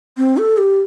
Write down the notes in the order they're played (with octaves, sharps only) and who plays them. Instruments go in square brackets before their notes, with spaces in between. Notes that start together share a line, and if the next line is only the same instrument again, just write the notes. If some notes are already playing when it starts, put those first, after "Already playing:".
[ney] C4
A4
G4